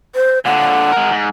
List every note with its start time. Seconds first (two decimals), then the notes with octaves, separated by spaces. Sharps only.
0.15 C5
0.45 A#2 D3 F#5
0.92 G#3 A#4
1.11 G#2